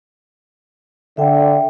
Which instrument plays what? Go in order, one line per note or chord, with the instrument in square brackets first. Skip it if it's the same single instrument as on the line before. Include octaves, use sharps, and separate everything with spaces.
[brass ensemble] D3 [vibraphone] E5 G5